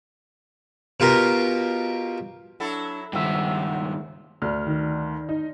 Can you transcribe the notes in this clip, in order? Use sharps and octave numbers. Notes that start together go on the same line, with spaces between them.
B2 F4 G4 A#4
F#3 D4 E4 A4
C#2 G2 C3 D#3 F3 E5 F#5
D2 D5 F6
D#3
D#4